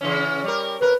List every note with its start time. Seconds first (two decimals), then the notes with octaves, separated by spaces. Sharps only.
0.01 C#3 E3 C#4
0.44 G3 A#4
0.81 C3 A#4 B4